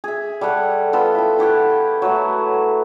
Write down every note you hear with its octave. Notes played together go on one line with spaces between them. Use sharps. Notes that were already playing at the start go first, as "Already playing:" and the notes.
G#4 E5
G3 A4 C#5 F#5
B3 F4 A4
E4 G5
E4 G4 C#5 F#5
F#3 A3